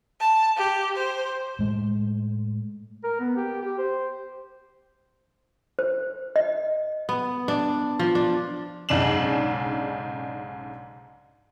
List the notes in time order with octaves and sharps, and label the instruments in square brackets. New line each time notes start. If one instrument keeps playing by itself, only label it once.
[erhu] A5
G4
C5
[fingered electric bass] A2 G#3 A3
[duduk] A#4
B3
G4
G4
C5
[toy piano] C5
D#5
[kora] B3
D4
F3
D4
[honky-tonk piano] B1 G#2 C#3 D4 E7 F#7